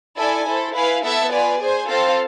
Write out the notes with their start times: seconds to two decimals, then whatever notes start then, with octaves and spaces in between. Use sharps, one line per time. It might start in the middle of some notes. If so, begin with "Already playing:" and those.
0.17 E4 A4 D5 G#5
0.47 E4 A4 C5
0.75 E4 B4 F5 G#5
1.03 B3 E4 A4 E5 A5
1.32 F4 B4 D5 G#5
1.60 G#4 C5 G#5
1.89 C4 F4 A4 C5 F5